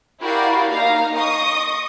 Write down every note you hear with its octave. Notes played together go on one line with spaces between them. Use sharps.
E4 F#4 G4 A#4 D5 F5
A#3 D#4 F5 A#5
D#5 C#6 D#6